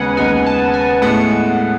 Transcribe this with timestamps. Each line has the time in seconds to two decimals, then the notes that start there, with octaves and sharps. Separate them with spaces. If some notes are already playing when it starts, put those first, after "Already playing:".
Already playing: D#2 C#3 G#3 B3 D#4 B4 F#5 G#5
0.17 D#2 C#3 G#3 B3 D#4 G#5
0.46 A5
0.73 G#5
1.02 A2 G#3 B3 F#5